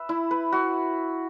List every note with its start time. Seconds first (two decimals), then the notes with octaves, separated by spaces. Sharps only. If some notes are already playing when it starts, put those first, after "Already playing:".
Already playing: B4 E5
0.09 E4
0.31 B4
0.52 F#4